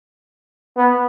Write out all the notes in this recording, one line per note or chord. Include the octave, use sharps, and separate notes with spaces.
B3